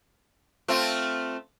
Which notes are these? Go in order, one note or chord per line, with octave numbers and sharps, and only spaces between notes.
A3 C4 F4